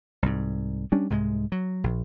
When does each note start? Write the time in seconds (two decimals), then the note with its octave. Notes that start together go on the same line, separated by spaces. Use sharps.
0.23 C2 G#2
0.92 G3 C#4 D4
1.10 C2 G#2 F3 G#3
1.52 F#3
1.84 A#1